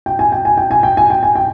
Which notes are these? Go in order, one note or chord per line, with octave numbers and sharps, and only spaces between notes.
G5
G#5
G5
G#5
G5
G#5
G5
G#5
G5
G#5
G5